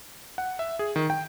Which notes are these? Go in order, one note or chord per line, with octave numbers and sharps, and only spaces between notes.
F#5
E5
G#4
D#3
G5